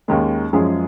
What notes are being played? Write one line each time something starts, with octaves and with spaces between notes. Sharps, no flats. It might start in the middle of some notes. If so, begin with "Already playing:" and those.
D#2 D#3 G#3 C#4
F#2 F3 G#3 C#4 G#4